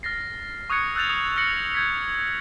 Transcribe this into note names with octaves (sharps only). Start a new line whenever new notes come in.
F6 A6 A#6 C7
C#6 D#6 F#6 G#6 C#7
E6 F#6 G6 A6 F7
D#6
F6 A#6 C#7 F#7
G6 G#6 B6